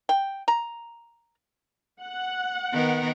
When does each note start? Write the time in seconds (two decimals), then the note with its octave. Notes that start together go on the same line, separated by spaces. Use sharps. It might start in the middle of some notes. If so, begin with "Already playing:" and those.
0.09 G5
0.48 A#5
2.01 F#5
2.73 D#3 B3 A#4